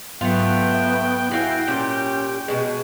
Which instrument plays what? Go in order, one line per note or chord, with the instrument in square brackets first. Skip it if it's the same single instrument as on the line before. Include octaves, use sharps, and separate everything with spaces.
[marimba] G#2 F#3 [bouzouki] A3 F4 [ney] B3 [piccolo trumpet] G5
[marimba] E5
[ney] E4 [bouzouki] F#4 F5 G#5
[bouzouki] A#2 G4 [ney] C#4
[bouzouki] B2 G#3